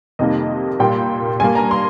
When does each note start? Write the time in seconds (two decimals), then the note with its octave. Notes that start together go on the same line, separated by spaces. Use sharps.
0.19 F2 C3 D#3 G3 A#3 D#5
0.79 A#2 G3 A#3 G5
1.40 G2 G3 A#3 G#5
1.55 A#5
1.71 C6